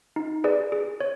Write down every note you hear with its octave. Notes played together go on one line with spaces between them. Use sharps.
D#4
G#4 B4 D5
G#4
C#5